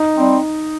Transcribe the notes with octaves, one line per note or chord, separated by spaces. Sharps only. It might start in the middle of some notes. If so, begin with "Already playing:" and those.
Already playing: D#4
G3 C4